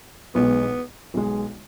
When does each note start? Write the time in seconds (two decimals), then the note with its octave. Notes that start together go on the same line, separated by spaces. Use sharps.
0.35 B1 B2 G#3 B3
1.14 B1 B2 G#3